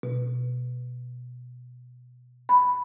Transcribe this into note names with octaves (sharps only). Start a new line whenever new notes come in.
B2
B5